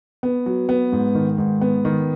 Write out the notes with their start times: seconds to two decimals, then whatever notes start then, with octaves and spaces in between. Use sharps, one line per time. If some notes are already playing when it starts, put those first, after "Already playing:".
0.23 B3
0.46 F#3
0.69 B3
0.92 G#2
1.15 D#3
1.38 G#2
1.61 B3
1.85 D#3